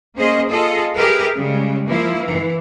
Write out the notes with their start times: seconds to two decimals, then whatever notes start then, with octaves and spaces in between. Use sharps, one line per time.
0.17 A#3 C#4 G#4 C5 D#5
0.48 F4 G#4 A4 D#5
0.94 G4 G#4 A#4 B4 E5
1.35 C#3 G3 G#3
1.87 F3 A#3 E4
2.20 E3